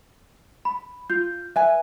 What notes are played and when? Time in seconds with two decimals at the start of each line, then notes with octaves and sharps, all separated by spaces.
0.65 B5
1.10 F4 G6
1.56 B4 E5 G#5